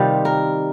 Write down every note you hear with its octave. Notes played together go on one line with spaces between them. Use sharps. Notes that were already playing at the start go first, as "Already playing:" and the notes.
Already playing: C3 D#3 G3 F4 G4
A#4